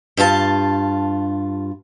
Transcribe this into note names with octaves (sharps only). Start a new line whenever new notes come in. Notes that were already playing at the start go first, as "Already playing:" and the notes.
G2 F4 A#4 A5